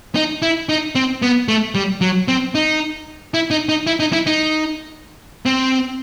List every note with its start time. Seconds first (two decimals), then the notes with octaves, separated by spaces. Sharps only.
0.15 D#4
0.42 E4
0.69 D#4
0.95 C4
1.22 B3
1.48 A3
1.75 G3
2.01 F#3
2.28 C4
2.55 D#4
3.34 E4
3.51 D#4
3.69 D#4
3.87 E4
4.00 D#4
4.12 E4
4.27 D#4
5.46 C4